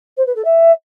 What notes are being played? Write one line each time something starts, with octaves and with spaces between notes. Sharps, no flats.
C5
B4
A4
E5